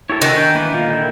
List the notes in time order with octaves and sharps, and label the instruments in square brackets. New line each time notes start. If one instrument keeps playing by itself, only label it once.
[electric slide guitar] E4 G4 A#4 [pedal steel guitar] A4 C#5
[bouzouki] D#3 [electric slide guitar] D4 G#5 [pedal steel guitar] F#4 A4
[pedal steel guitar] G5
E3 A#3 B4
[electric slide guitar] A#2 D3 [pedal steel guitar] F4
[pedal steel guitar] E4 G5